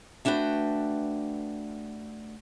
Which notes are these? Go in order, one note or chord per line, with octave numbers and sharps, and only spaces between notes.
A3 D4 F#4 B4 G5